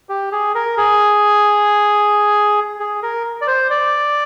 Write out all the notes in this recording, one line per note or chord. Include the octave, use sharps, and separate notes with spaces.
G4
G#4
A#4
G#4
G#4
A#4
D5
C5
D5